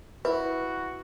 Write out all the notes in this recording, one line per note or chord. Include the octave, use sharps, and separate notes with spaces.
E4 F#4 B4